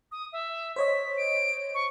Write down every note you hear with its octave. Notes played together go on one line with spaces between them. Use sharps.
D#6
E5
C5 C#5 D#5 B6
D7
C#6